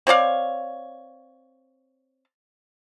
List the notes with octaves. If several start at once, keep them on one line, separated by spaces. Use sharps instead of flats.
C4 C#5 D5 F5